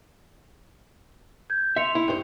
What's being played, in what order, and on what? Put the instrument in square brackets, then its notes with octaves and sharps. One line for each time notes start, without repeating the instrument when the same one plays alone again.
[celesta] G6 G#6
[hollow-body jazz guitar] E5 [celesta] C6 C#7 F7
[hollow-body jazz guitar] E4
G2 C5